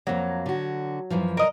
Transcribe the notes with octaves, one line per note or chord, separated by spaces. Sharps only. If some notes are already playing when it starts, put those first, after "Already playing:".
F2 F#3 A#3
D3 F#4
F#2 E3 F3
A#4 D#5